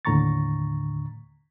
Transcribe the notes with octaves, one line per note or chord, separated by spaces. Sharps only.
D#2 A2 D3 A#5 C#6 A6